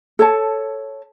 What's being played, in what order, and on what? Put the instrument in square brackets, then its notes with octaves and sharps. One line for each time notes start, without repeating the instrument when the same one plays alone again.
[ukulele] A4 C#5 A5